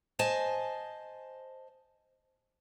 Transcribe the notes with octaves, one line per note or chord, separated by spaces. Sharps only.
C5 D#5 G#5 A5